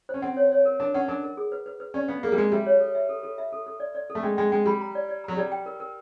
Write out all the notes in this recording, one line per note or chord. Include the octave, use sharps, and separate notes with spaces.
C#4 C5
C4 F#5
C#5
C#5
A#4
D4 A#4
C#4 F#5
D4 A#4
A#4
G#4
B4
B4
B4
C#4 D5
B3 F5
A#3 G#4
G3
G#3 F5
G3 E5
C#5
A4
E5
A4
A4
E5
A4
A4
D5
D5
A4
A3
G#3 G5
G#3 G5
G#3 G5
G3 B5
A#5
D5
D5
F#3 A#5
G3 D5
G5
A#4
A#4